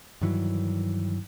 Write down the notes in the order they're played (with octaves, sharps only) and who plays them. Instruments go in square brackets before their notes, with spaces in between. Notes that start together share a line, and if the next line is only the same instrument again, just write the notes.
[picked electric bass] G2 D#3 E3 F#3